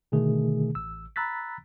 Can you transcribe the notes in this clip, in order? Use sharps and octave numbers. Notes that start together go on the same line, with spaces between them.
B2 D3 D#3 A3 G#4
A1 E6
A#5 B5 E6 F#6 A6 B6